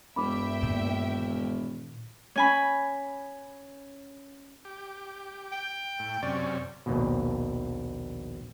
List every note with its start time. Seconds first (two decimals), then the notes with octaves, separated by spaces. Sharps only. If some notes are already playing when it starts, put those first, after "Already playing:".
0.16 E1 G2 E5 G5 B5 D6
0.62 A#2 D#3
2.36 C#4 G#5 B5
4.65 G4
5.52 G5
5.99 A2
6.22 F#2 C3 C#4 D5
6.86 A#1 D#2 B2